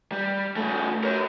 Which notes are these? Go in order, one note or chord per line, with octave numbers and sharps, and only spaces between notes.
G3
C#3 A3
A#4 C#5